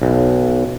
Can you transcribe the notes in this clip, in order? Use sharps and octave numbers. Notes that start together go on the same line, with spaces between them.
B1